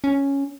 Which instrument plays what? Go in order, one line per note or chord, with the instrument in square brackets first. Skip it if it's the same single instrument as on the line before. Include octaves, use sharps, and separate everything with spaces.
[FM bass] C#4